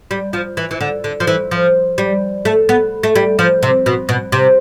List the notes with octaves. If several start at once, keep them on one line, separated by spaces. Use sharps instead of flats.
G3
F3
E3
E3
D3
D3
F3
E3
F3
G3
A3
B3
A3
G3
F3
C3
B2
B2
C3